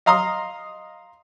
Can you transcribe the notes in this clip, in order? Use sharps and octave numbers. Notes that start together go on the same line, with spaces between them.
D#5 F5 A#5 C6 D#6